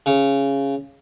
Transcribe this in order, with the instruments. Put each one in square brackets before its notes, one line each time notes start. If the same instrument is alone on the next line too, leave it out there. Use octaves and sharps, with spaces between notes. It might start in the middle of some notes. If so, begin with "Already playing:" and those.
[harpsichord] C#3